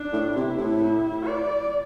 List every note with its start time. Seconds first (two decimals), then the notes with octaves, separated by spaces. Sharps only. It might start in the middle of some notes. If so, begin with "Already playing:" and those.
Already playing: D4
0.12 A2
0.36 C3 E4
0.58 A2
0.82 E4
1.27 D5